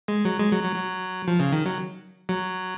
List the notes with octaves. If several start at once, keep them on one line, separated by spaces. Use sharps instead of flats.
G#3
F#3
G#3
F#3
F#3
F#3
F3
C#3
D#3
F#3
F#3